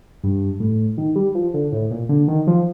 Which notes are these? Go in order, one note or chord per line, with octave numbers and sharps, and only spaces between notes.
G2
A2
D#3
G3
F3
D3
A2
A#2
D3
D#3
F3